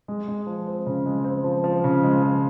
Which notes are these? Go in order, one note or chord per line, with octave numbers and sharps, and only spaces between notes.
G#3
G#3
F3
C4
C#3
G#3
C4
F3
F3
C#3
G#3
F3